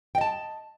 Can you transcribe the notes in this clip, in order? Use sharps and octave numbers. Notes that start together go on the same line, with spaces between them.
D#5 G5 A5